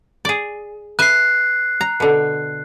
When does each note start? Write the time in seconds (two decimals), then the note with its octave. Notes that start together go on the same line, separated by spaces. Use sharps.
0.25 G#4 D5
0.99 B4 E5 F#6 C7
1.81 A#5
2.00 B2 D3